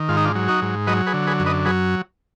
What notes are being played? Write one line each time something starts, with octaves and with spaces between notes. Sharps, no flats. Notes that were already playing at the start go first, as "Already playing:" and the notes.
Already playing: D#3
G#2 F4
D#4
D4 F4
F#3
D#4 F#4
G#2
F#3 B4 D#5
G#4 B4
D3
G#4 B4
F#2
B4 D#5
F#3 G#4 B4